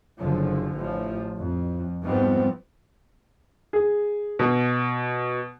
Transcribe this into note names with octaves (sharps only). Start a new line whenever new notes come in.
F#1 D3 F3
A1 F3
F2
G#2 F3 G3 B3 C4
G#4
B2